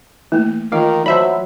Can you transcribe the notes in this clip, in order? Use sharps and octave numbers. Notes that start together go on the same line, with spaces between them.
E3 A3 A#3
D#3 E3 F4 F5
F#3 C5 D5 E5 A5 B5